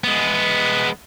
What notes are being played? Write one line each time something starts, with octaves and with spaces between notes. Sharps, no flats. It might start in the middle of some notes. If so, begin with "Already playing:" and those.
G#3 B3